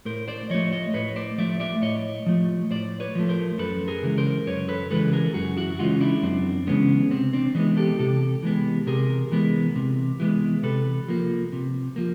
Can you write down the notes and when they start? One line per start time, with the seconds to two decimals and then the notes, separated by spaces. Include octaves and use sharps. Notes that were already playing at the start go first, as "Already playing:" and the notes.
0.05 A2 A#4 C5
0.28 C5 D5
0.50 F3 A3 C#5 D#5
0.72 C#5 D#5
0.94 A2 B4 C#5
1.16 C5 D5
1.38 F3 A3 D5 E5
1.60 D5 E5
1.82 A2 C#5 D#5
2.26 F3 A3
2.70 A2 C5 D5
3.00 B4 C#5
3.15 F3 A3
3.29 A#4 C5
3.58 F#2 A4 B4
3.88 G#4 A#4
4.03 C#3 E3 G#3
4.18 A#4 C5
4.47 F#2 B4 C#5
4.68 A4 B4
4.91 C#3 E3 G#3 A4 B4
5.13 G#4 A#4
5.34 F#2 F#4 G#4
5.57 E4 F#4
5.79 C#3 E3 G#3 D#4 F4
6.01 D4 E4
6.23 F#2 C4 D4
6.67 C#3 E3 G#3 B3 C#4
7.11 C3 C4
7.33 C4 D4
7.55 E3 G#3 B3 C#4 D#4
7.77 G4 A4
7.99 C3 G4 A4
8.43 E3 G#3 B3
8.87 C3 G#4 A#4
9.32 E3 G#3 B3
9.76 C3
10.20 E3 G#3 B3
10.63 C3 A4 B4
11.08 F3 A#3
11.52 C3
11.96 F3 A#3